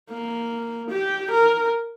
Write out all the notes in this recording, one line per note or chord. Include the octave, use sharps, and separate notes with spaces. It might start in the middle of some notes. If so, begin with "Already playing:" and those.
A#3
G4
A#4